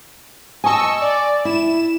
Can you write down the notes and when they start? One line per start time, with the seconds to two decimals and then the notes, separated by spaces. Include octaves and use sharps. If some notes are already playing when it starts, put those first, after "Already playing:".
0.64 D#5 G#5 A5 C#6 E6
1.00 D5
1.45 E4 E7